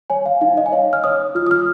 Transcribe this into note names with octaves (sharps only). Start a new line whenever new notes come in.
C#5 G#5
F5
D#4 F5
D#5
G#5
C#5 F5
F6
C#5 D#6
F4 F6
D#6
F6